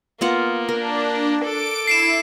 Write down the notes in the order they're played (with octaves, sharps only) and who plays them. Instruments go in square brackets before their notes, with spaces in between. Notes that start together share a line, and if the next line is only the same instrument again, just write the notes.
[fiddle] A#3 [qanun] B3 F4 F#5
[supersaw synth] D4 [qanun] A#4
[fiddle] A4 D6 [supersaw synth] D7
[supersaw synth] E4 [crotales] C7 D7 E7